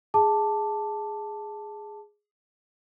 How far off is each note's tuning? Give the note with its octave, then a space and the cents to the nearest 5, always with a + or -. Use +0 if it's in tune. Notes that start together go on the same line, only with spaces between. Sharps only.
G#4 +0 A5 +0 D6 +5